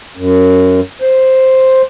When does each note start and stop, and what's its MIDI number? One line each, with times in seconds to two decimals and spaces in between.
0.17 0.80 42
1.02 1.82 72